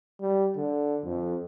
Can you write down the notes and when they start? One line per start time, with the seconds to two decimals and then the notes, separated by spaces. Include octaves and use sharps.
0.21 G3
0.56 D3
1.05 F2